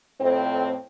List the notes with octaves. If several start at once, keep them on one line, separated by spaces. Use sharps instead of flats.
F2 A2 C4